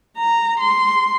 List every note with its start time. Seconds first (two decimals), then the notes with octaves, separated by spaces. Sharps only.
0.18 A#5
0.60 C6